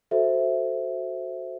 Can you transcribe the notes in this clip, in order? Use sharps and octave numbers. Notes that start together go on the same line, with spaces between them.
F#4 A4 C5 E5